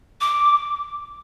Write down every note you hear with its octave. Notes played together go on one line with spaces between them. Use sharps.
D6